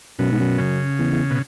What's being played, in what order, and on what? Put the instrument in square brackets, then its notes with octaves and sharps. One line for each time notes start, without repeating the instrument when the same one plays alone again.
[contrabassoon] F#2 [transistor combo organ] B2
[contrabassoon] G#2
F#2
[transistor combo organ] C#3
[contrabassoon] E2
E2
[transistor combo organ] B2